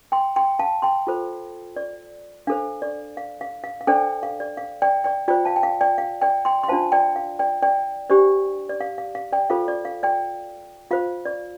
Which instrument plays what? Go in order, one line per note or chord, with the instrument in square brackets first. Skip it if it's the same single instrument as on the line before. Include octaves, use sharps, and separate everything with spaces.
[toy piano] G5 C6
G5 C6
F5 A5
G5 C6
F4 A4 C5
D5
D4 A4 C5 F5
D5
F5
F5
F5
F5
D4 A4 C5 D5 G5
F5
D5
F5
D5 G5
D5 G5
F4 C5 D5 G5
F5 A5
G5
F5
D5 G5
F5
D5 G5
G5 C6
C6
D4 F4 C5 F5 A5
D5 G5
F5
D5 G5
D5 G5
D4 G4 C5 D5
D5
F5
F5
F5
D5 G5
F4 A4 C5 F5
D5
F5
D5 G5
F4 C5 F5
D5